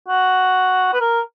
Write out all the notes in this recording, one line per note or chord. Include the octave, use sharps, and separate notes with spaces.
F#4
B4
A#4